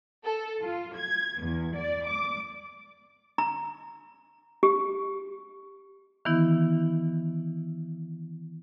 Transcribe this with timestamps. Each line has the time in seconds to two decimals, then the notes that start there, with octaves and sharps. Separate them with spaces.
0.24 A4
0.63 F4
0.96 G#6
1.41 E2
1.76 D5
2.07 D6
3.38 A#5
4.63 G4
6.25 D#3 E3 B3 E4